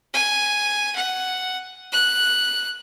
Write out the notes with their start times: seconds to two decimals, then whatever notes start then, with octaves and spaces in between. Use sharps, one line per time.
0.14 G#5
0.96 F#5
1.92 F#6